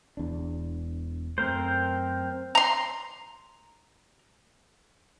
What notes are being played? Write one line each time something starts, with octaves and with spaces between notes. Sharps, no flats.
E1 E2 D4
F#2 A3 C4 A#4 C5
A#5 C6